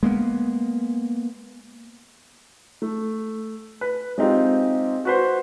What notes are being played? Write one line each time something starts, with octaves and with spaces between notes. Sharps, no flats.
G#3 A#3 B3
A3
B4
G#3 C4 D#4 F4 G4
F#4 B4 C5